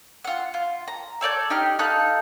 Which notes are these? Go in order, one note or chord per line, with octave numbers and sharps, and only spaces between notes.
F4 F#5
F4
A#5
A4 C#5 D5 G6
D#4 G4 F6
D#4 A4 F5 F#6